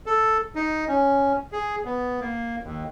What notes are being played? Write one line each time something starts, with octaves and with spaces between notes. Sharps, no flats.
A4
D#4
C#4
G#4
B3
A#3
D#2